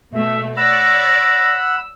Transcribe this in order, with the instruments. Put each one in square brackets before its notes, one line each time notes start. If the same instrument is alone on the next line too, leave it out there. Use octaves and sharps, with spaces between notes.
[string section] B2 A3 [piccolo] E5
[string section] C#5 D5 [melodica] F#5 B5 [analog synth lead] E6 [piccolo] A#6